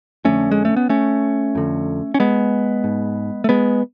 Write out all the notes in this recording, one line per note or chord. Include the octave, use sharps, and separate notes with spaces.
F2 D3 A3 C#4
G#3
A3
B3
A3 C#4
F2 D3
C#4
G#3 B3
G#2
A3
G#3 B3